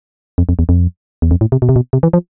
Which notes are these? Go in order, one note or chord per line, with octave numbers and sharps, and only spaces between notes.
F2
F2
E2
F2
E2
F2
A2
C3
B2
C3
B2
C3
E3
F3